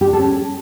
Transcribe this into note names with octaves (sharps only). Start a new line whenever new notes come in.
G4
D4
A4
C#4